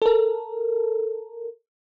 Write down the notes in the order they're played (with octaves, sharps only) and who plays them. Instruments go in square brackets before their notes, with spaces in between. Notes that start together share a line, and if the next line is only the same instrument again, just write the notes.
[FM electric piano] A4 A#4